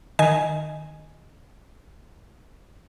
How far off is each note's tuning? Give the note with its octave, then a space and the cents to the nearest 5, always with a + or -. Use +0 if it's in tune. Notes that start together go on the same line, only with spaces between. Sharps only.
D#3 -20 D#5 -5 G#5 +0